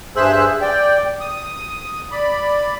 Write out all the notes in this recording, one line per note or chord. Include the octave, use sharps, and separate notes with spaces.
G2 G#4 C5 E5 E6 F#6
D5 G5
D#6
D5 B5